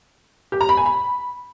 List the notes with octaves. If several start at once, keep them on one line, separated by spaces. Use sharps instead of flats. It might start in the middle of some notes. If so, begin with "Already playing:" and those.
G4
A#5
B5
G#5
B5